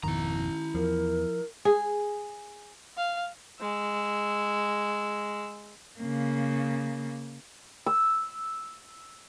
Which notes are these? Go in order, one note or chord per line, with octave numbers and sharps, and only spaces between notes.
G#1 F2 B2 D#3 E4 A#5
E2 F3 A#4
G#4
F5
G#3 E6
C#3 A#3
E6